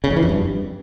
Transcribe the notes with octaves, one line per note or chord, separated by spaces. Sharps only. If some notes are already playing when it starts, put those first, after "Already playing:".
C#3
F2
E3
F2
G2